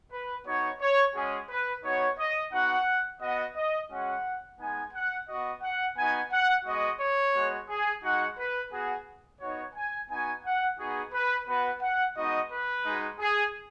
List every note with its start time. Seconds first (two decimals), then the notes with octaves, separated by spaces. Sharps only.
0.11 B4
0.45 B3 D#4 F#4 C#5
0.80 C#5
1.14 G#3 C#4 F#4 G#4
1.49 B4
1.83 B3 D#4 F#4 C#5
2.18 D#5
2.52 B3 D#4 F#4 F#5
3.20 B3 F#4 D#5
3.55 D#5
3.90 G#3 C#4 F#4 F#5
4.59 G#3 B3 D#4 G#5
4.93 F#5
5.28 B3 F#4 D#5
5.62 F#5
5.96 B3 D#4 F#4 G#5
6.31 F#5
6.65 G#3 B3 F#4 D#5
6.99 C#5
7.34 G#3 B3 F#4
7.68 G#4
8.03 G#3 D#4 F#4 F#5
8.37 B4
8.71 B3 F#4 G#4
9.40 B3 D#4 F#4 C#5
9.75 G#5
10.09 B3 D#4 F#4 G#5
10.43 F#5
10.78 B3 D#4 F#4 G#4
11.12 B4
11.47 B3 F#4 B4
11.81 F#5
12.15 G#3 B3 D#4 F#4 D#5
12.51 B4
12.84 G#3 D#4 F#4
13.19 G#4